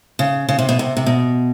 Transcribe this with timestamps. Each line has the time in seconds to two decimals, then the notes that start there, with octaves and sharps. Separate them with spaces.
0.19 C#3
0.49 C#3
0.59 C3
0.69 B2
0.79 C3
0.97 C3
1.06 B2